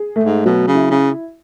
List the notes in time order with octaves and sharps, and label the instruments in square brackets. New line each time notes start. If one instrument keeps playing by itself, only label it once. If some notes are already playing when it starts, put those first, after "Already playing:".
Already playing: [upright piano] G#4
A3
[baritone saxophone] G#2
[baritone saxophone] B2 [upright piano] F#3
[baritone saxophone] C#3
[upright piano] E4
[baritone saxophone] C#3